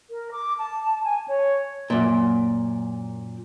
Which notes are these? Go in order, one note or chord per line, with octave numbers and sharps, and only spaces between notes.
A#4
D6
A5
G#5
C#5
F#2 A#2